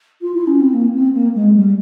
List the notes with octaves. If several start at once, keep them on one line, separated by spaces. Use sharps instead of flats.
F4
E4
C#4
C4
A#3
C4
A#3
G#3
G3